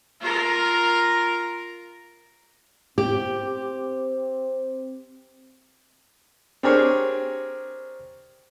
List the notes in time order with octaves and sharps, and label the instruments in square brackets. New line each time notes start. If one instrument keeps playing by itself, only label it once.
[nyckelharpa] F4 A#4
[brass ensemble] C4 [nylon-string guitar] G4
[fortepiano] C4 D4 G4 G#4 A#4 C#5